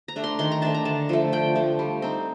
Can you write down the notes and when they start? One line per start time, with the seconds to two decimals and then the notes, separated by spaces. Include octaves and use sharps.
0.08 A#5
0.16 A3 D4
0.24 C6
0.39 D#3 C6
0.51 A#5
0.62 A3 D4 A5
0.74 A#5
0.85 D3 A5
1.09 F3 A3
1.32 D3 G5
1.55 F3 A3
1.79 G3
2.02 C4 D#4